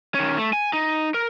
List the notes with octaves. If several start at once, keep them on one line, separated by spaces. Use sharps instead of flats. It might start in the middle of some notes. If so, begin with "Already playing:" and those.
D#3 C#4
A3
G#5
D#4
A#4